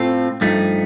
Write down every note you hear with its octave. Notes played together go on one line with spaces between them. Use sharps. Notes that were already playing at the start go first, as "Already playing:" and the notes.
Already playing: A2 A3 C4 F4 A4
G2 F3 A3 D#4